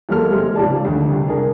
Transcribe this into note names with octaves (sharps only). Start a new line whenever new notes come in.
E2 F#3 G#3 A#3 A4 F6
C3 G#3
C#2 G#2 F3 G4 D5 A5
D2
C2
D4 G#4 A#4